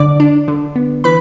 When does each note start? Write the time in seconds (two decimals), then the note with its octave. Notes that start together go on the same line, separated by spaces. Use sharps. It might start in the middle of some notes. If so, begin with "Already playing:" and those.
Already playing: D3 D5 D6
0.20 D4
0.48 D3
0.76 B3
1.04 E3 B4 B5